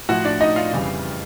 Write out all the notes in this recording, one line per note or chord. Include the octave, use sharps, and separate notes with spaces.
A2 F3 F#4 F#5
D4 D5
D#4 D#5
F4 F5
F2 C#3 E3 G3